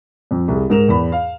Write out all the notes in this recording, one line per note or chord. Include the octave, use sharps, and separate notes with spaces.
F2
C2 G#4
G#2 A#4 E7 F7
E2 B5
F5